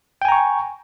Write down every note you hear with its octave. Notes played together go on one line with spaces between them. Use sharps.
G5 G#5 A#5 C#6